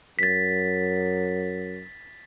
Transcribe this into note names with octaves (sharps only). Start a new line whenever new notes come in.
F#2 A6 B6